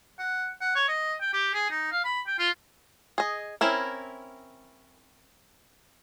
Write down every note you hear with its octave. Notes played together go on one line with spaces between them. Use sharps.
F#5
F#5
C#5
D#5
G5
G4
G#4
D#4
F5
B5
G5
F4
G#4 D#5
C4 C#4 E4 A#4